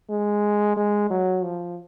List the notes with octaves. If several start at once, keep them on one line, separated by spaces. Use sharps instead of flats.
G#3
G#3
F#3
F3